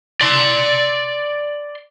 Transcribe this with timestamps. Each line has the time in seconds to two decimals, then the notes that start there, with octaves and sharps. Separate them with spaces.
0.21 D5 C6